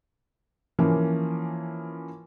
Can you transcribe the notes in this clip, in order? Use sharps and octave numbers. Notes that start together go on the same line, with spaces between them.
E3 F3 A#3 C#4